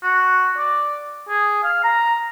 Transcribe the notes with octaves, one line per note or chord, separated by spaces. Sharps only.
F#4
D5
G#4
F5
A#5